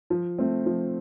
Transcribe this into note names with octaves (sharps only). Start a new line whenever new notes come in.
F3
A3 C4
F3